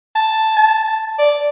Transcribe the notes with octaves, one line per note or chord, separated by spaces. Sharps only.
A5
A5
D5